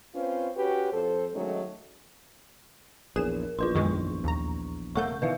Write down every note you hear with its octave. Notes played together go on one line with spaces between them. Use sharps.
C4 C#4 F4 B4 C5
C#4 F#4 G4 B4
F2 A4 C5
D#3 F#3 G#3 A3 C#4 D#4
A#1 E2 G#4 A#4 E7
A#1 E2 F4 B4 C6
F#2 D#3 G#3 C#6
D#2 A#5
E1 C#3 A3 A#3 F#5 C#6 G6
B2 D#3 E3 B4 E5 F5